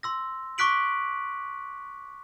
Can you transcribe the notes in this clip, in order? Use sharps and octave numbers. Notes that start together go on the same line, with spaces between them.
C6 E6 A#6
C#6 D6 F#6 B6 D7 F#7